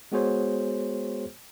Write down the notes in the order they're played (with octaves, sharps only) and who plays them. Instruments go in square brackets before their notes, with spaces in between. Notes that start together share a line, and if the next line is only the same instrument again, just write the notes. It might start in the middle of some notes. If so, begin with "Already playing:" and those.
[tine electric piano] G#3 B3 F#4 G#4 C5 C#5